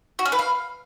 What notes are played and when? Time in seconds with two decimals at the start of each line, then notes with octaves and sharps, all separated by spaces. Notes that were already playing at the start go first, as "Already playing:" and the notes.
0.19 F#4
0.26 C#4
0.32 B4
0.39 F5